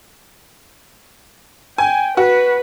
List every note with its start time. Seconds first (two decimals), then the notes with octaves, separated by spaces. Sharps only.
1.78 G5 G#5
2.17 F#4 B4